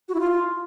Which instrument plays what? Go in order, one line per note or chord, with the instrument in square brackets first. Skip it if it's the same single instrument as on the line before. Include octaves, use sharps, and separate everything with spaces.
[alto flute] F#4
E4
F4